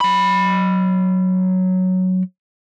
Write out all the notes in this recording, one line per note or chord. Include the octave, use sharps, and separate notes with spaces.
F#3 B5